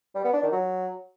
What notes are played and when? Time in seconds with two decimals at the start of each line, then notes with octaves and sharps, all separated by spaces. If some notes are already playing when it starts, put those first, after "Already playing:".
0.15 G3
0.24 B3
0.33 D4
0.43 D#3
0.52 F#3